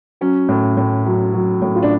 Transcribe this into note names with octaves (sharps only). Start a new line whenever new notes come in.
F#3 C#4
A2
A2
F#3
F#3
A2
F4
D4